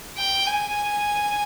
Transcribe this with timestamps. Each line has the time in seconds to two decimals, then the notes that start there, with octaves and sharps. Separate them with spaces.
0.18 G5
0.46 G#5